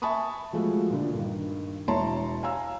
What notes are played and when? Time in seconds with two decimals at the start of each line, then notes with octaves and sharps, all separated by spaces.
0.02 E5 G#5 A5 B5 C#6 D#6
0.53 F3 G#3 A3 F#4
0.90 A#2 D3
1.14 G2 D#3
1.88 E1 E4 C#5 A5 A#5 C6
2.43 F5 G#5 A#5 E6